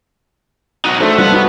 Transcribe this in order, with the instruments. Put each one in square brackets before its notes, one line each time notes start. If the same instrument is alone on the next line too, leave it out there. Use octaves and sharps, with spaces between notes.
[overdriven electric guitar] D#4 F#4
[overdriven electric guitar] A3 [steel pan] D4 A4 C5
[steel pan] G3 D4 F4 [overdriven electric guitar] B4 F#5
[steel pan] B3 D#4 F#4